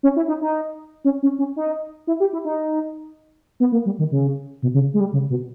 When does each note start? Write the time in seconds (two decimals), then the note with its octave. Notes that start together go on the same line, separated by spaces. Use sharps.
0.03 C#4
0.16 E4
0.28 D#4
0.41 D#4
1.05 C#4
1.23 C#4
1.39 C#4
1.56 D#4
2.07 E4
2.20 G4
2.33 E4
2.45 D#4
3.60 B3
3.72 A#3
3.86 G3
3.99 D#3
4.11 C#3
4.63 B2
4.74 C#3
4.94 G#3
5.00 G3
5.13 C#3
5.30 B2